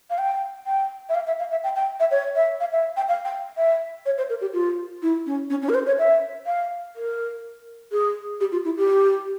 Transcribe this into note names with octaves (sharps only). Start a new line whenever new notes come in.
F5
G5
G5
E5
F5
E5
F5
E5
G5
G5
E5
C#5
E5
F5
E5
G5
F5
G5
E5
C#5
C5
A#4
G4
F4
E4
C#4
C#4
C#4
A#4
C5
C#5
E5
F5
A#4
G#4
G4
F4
E4
G4